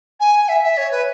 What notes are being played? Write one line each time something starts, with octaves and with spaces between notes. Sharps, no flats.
G#5
E5
E5
C#5
B4